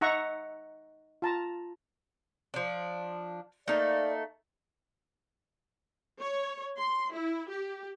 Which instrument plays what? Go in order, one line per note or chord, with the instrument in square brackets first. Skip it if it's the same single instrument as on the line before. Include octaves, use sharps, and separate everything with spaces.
[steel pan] D#4 E5 F#5 A#5 C#6
F4 A5 A#5
[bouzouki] F3 D4
[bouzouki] A3 A#3 D#4 [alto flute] D5
[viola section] C#5
C6
E4
G4